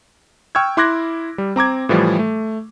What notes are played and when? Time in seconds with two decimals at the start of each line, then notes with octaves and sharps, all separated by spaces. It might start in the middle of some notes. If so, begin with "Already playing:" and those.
0.55 G5 C#6 E6 F6 G#6
0.77 E4 C6 D6 F#6 G#6 A#6
1.38 G3
1.56 C4 A#5 D6 G#6
1.89 A2 E3 F3 G3
2.19 A3